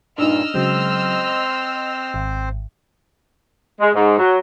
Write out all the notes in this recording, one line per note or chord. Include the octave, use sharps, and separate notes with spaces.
G2 A#2 D4 D#4 D#5 E6 F6
C#3 F#3 G#3 C4 C5
C6
G#1
G#3
G#2
F#3